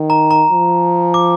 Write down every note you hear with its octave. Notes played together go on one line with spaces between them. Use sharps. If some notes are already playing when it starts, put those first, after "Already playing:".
Already playing: D#3
A#5
A#5
F3
D6